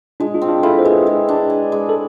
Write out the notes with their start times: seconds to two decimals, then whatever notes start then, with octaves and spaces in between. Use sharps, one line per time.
0.20 G#3 D4 F4
0.34 D4 F4
0.42 C4
0.48 D4 F4
0.63 E4 F4 A4
0.79 C5
0.85 G#3 G#4 B4
1.07 G#3
1.29 D4
1.50 G#4
1.72 G#3
1.89 A4